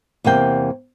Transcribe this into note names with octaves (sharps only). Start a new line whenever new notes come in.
E2 C3 A#3 G5